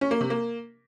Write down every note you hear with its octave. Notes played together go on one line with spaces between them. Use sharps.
C#4
A#3
C3
A#3